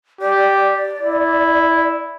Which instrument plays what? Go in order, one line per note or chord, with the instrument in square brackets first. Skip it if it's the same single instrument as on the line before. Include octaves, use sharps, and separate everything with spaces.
[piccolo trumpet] G4 [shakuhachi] D5
[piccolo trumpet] E4